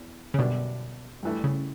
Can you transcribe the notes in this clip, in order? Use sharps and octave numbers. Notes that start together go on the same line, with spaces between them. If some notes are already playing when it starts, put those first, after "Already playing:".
Already playing: E2
C#3
F#2 B2 D3 G3 D4
G2 E3 A3
C#3